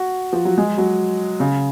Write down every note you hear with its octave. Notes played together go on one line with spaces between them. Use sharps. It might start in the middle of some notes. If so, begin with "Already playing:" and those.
Already playing: F#4
F3
F#3
G#3
F#3
C#3